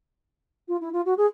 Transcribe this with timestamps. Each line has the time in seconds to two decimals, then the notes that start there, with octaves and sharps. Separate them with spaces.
0.68 F4
0.81 E4
0.93 F4
1.05 F#4
1.17 G#4